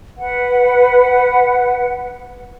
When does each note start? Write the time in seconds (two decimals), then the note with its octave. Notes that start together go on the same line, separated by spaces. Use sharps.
0.17 B4 F#5